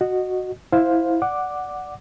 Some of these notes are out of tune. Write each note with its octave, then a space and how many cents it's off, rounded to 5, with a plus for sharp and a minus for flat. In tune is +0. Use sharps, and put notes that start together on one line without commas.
F#4 +0 D#5 -15
E4 +0 C5 +0 F5 +15
D5 +0 F#5 +0 D6 +5